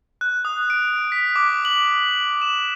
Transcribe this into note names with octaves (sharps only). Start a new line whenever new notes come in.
F#6
D#6
D7
B6
D6
F#7
E7